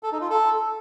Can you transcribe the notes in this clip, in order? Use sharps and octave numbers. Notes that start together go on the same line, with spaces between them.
A4
D#4
F4
A4